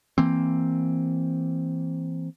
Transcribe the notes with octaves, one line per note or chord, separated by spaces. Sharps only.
E3 A#3 C4